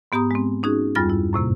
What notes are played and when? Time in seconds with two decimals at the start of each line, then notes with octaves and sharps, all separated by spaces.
0.12 G#2 B3 G4 A#5 D#6
0.31 G#3 C4
0.63 C#4 D#4 F#4 G#4
0.95 E2 G2 G3 F4 F6 A6
1.10 E4
1.33 F#2 A2 C3 A#3